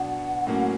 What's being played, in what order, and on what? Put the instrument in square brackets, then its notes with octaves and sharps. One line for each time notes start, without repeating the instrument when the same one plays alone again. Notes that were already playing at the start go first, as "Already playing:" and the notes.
Already playing: [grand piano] B2 F#3 B3 D4 [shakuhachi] F#5
[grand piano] A2 F#3 A#3 C#4